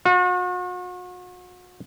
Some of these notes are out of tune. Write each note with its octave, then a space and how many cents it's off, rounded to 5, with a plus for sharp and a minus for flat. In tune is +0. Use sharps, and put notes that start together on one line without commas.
F#4 -40